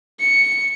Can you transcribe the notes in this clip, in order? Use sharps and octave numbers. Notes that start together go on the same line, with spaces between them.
C#7